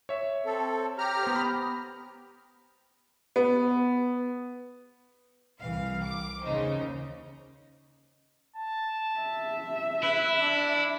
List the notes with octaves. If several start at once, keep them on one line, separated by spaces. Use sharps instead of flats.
C#5 E5
C4 A4
G4 A#5 F6
B3 C5
B5 D#6
B3
C2 E3 F5
D6
D#2 C#3 D#4 C5
A5
E5
E4 B4
D4